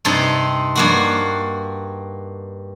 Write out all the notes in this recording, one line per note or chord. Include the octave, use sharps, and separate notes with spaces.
G2 C3 C4 D#4
G2 A#3 F#4